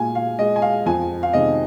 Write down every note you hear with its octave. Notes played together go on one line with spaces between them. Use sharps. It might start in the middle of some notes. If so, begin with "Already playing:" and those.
Already playing: A#2 G#3 F5 G#5
F5
G#3 D#5
G#5
F5
F2 G#5
F5
C3 D#3 G#3 D#5